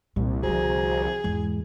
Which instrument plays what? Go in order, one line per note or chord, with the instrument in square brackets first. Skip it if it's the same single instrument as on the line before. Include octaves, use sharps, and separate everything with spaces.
[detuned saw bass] C2 [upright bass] A#2
[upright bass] D3 F3 [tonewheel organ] F#4 C5 A#5 [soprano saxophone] G#4
[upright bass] E2 [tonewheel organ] G#2 G#3